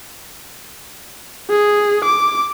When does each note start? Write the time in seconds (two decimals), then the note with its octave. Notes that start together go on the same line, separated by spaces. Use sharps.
1.50 G#4
2.05 D6